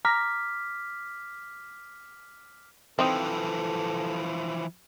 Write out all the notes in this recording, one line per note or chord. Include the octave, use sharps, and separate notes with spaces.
A#5 D6 F6 B6
E3 F3 C4 D#4 A4